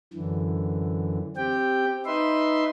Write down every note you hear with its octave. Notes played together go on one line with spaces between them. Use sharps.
F#2 D3 E3
C4 G4 G5
D#4 B4 E5 C6